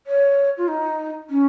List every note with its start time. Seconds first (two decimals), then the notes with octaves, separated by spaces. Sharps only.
0.06 C#5
0.57 F4
0.68 D#4
1.30 C#4